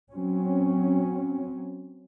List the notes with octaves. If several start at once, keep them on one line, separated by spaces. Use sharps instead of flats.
F#3 C4 C#4